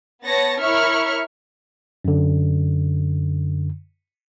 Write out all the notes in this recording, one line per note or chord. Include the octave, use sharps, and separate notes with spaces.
B3 C#5 A5 A6 A#6 C#7
E4 A#4 C#5 E5 C#6 F6
F#2 D3